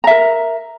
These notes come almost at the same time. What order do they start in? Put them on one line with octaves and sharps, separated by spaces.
A#5 E5 A#4